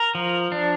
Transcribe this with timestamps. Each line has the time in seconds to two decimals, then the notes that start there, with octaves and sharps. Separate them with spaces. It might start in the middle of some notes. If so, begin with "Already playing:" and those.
Already playing: A#4
0.15 F3
0.52 D4